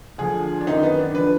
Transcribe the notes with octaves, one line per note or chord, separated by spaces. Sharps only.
D2 D3 F3 G#4
D4
F#2 D#3 D#4
B3
D4
D3 F3 B4